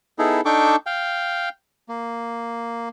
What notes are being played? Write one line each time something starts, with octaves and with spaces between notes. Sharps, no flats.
B3 D#4 E4 G#4 A4
D4 D#4 A4 G5 C#6 D6
F5 G5
A#3